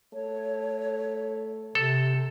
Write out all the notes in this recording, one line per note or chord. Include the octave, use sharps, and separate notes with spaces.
A3 C#5
C3 A4